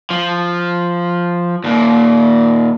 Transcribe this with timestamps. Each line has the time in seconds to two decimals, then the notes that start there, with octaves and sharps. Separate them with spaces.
0.11 F3
1.64 D#2 A#2